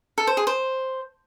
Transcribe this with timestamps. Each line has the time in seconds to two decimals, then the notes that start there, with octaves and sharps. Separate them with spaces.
0.18 A4
0.27 C5
0.37 G#4
0.47 C5